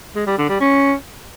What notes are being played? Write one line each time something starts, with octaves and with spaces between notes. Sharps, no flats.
G#3
G3
D3
G3
C#4